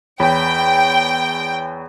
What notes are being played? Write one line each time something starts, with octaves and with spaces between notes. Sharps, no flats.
E2 C#5 G5 B5